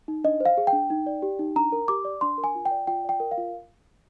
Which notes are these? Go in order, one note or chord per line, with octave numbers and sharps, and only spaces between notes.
D#4
D4 D#5
C5
F5
G#4
G5
D4
D#4
D5
G4
D#4
D4 A#5
A#4
G4 D6
D5
D4 C6
A#4
G#5
F4
G5
D5
F4 G5
D5 G5
A#4
F5
F4